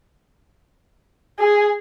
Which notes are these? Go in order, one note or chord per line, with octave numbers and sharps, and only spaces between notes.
G#4